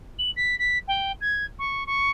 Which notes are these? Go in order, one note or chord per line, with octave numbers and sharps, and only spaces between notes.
F#7
B6
B6
G5
G#6
C#6
C#6